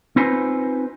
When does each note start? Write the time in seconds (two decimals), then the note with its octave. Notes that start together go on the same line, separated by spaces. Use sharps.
0.16 C4 D#4 F4 B4 C5 G#5